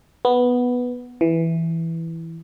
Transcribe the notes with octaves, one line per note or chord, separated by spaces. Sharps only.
B3
E3